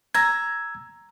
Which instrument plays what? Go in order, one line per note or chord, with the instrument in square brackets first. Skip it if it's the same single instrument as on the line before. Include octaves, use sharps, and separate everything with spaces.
[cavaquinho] A#5 [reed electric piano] E6 G#6